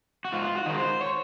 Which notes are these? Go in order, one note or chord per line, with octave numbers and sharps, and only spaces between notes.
F#4
G#2 F4
F#4
D#3 G#3 A#4
C5
C#5